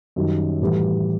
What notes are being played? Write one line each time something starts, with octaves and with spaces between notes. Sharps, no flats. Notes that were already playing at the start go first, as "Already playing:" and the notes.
F#2 D#3 G3
A2 E3 G3